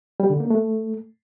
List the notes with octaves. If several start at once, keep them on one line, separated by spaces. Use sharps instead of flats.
G3
D3
A#3
A3